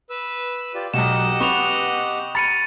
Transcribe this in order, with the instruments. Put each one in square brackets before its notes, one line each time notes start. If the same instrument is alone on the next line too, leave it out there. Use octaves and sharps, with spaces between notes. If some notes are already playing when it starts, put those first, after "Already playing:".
[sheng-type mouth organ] B4 E6
F4 G4 D5
[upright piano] B1 B2 [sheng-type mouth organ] G4 D#5 F#5 [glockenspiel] E7
[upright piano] B3 B4 [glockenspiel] C#6 F7
[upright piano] B5 [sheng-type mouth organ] F6 [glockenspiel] A6 C#7 D#7